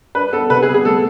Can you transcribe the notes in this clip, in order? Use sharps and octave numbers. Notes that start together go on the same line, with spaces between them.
D4 B4
B3 A4
C3 B4
G#4
B3
G#4
A3 A4